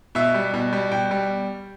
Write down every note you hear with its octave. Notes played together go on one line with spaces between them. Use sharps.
B2 E5
G3
B2
G3
B2 G5
G3